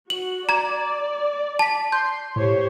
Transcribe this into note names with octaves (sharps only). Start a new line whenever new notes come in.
F#4 F#7
D5 A#5 G#6
A5 B6
C6 G6
A2 G4 C5 C#5